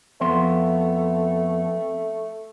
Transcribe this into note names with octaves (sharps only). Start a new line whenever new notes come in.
F2 A3 B3 C6